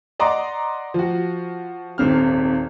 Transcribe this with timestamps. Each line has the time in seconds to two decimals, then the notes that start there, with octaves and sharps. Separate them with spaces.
0.20 D5 D#5 F#5 A#5 C6 D6
0.94 F3 F#4
1.98 D#1 G#1 C4 F6